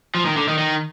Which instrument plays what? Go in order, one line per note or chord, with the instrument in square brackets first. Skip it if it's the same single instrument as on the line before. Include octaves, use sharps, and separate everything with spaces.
[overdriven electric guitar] F3
D#3
D3
D#3
D#3